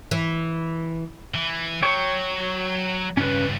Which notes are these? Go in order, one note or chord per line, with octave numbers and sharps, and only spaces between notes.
E3
E3
F#3 C#5 G5 C#6
C#2 G2 C#4 B4